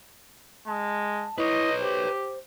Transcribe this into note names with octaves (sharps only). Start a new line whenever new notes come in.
G#3 A5
E4 B4 C#5 D#5
G4 C5